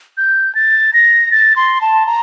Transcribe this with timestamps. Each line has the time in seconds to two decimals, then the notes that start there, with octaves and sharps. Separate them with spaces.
0.17 G6
0.55 A6
0.93 A#6
1.31 A6
1.56 C6
1.81 A5
2.07 A#5